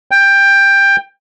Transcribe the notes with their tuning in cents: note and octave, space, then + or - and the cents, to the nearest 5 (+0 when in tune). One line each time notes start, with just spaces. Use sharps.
G5 +15